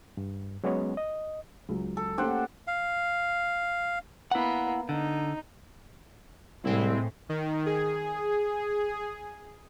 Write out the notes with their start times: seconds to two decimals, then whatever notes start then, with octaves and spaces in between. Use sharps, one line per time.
0.17 G2
0.64 F#3 G#3 B3 C#4 C#5
0.97 D#5
1.69 C#2 F#3
1.97 A4
2.18 A3 A#3 C#4 G4 C5 F#5
2.67 F5
4.31 A#3 B3 E4 F#5
4.89 D3 D#4
6.65 C2 A2 G#3 C4 E4
7.29 D#3
7.66 G#4